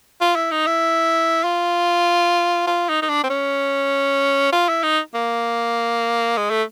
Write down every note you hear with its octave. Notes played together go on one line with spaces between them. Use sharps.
F4
E4
D#4
E4
F4
F4
D#4
D#4
D4
C4
C#4
F4
E4
D#4
A#3
G#3
A3